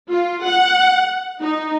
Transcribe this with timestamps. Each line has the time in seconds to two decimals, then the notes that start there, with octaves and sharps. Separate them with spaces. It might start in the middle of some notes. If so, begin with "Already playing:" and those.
0.10 F4
0.46 F#5
1.42 D#4